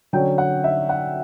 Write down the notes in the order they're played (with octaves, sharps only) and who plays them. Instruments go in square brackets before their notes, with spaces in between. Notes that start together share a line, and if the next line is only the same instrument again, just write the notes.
[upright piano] D3 F#3 C#4 G5
F#5
E5
F#5